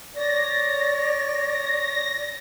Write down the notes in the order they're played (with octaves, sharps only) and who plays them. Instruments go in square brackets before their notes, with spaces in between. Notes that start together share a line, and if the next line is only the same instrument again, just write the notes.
[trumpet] C#5 [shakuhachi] D5 [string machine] A#6